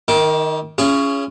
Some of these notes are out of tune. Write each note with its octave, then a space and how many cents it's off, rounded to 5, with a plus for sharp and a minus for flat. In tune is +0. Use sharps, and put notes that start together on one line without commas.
D#3 +0 D#4 +45 D6 +0
C#4 +10 F4 -40 G#4 +0